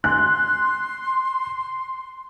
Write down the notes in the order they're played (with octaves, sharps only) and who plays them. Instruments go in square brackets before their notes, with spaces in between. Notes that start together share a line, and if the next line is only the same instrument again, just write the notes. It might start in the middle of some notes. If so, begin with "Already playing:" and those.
[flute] C6 [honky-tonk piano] F#6